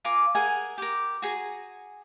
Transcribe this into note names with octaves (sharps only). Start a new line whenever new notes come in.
F4 A#4 G#5 D6
G#4 A#4 F#5 G#5
G4 A#4
F#4 G#4 G#5 A#5